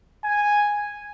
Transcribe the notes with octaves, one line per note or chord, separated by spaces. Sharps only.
G#5